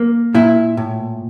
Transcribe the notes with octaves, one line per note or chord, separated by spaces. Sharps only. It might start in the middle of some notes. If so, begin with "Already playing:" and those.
Already playing: A#3
A#2 E4
A2